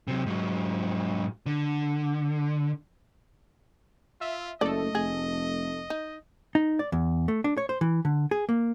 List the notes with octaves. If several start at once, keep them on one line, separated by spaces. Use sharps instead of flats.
C3 F#3
G#2 F#3
D3
F4 E5
F#1 A3 A4 D5 D#5
F1 G#4
D#4
D#4
D5
E2
A3
D4
C#5
C5
E3
D3
G#4
A#3